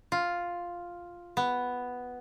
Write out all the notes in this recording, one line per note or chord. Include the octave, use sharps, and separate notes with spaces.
F4
B3